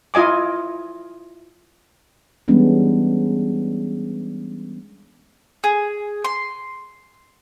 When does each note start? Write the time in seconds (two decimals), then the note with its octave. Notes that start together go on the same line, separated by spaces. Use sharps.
0.14 E4 F4 D#5 G#5 D6
2.48 E3 G3 G#3 B3 C#4 D4
5.64 G#4
6.24 C6